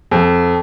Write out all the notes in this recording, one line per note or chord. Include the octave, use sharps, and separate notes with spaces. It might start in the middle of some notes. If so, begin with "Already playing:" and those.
F2